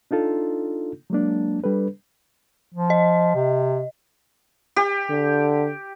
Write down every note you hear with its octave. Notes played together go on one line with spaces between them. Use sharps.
D4 D#4 F4 A4
F#3 G#3 A#3 D4
G3 D4 A4 B4
F3
D#5
C3
G4
D3